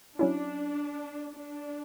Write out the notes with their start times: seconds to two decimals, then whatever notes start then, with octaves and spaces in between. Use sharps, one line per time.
0.19 F#3 C#4 D4 E4
1.35 D4